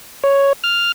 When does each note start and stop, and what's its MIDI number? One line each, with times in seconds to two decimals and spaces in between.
0.24 0.53 73
0.64 0.92 89